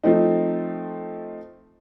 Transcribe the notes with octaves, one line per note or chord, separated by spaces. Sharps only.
F3 A3 C4 D#4